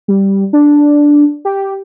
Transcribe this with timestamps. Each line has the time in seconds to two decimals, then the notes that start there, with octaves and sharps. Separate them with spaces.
0.08 G3
0.53 D4
1.45 G4